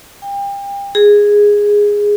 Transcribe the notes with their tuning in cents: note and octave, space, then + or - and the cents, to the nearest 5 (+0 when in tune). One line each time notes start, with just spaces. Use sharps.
G5 +35
G#4 -10